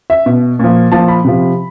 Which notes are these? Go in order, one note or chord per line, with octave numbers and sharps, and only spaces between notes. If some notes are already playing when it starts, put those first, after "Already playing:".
E5
B2
A#2 F3
A#2 F3 A5
B5
C3 F3